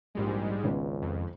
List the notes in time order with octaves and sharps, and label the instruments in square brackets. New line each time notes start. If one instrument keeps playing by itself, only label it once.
[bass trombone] A#1 [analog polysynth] G#2 G3 G#3
[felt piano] G#1 B3 C#4 [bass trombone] C#2
[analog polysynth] F2